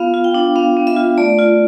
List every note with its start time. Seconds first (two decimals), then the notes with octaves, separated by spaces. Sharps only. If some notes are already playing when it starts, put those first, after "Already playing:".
Already playing: B3 F4 F5
0.14 F4
0.24 G5
0.34 D4
0.55 B3 F5
0.77 B3
0.87 E5
0.97 F4
1.18 A3 D5
1.39 F4